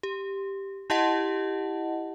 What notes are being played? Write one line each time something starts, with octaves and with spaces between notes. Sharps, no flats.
G4
E4 G4 D#5 F#5 A5